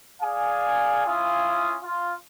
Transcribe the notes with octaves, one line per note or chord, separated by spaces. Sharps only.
G#4 D5 F5 G#5
C#4 E4 F4 F5 G#5 D#6
F4